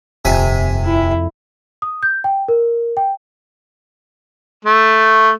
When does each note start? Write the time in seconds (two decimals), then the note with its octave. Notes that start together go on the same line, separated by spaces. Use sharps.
0.25 D#1 F2 C3 E5 G#5
0.85 E4
1.82 D#6
2.03 G6
2.24 G5
2.48 A#4
2.97 G5
4.65 A3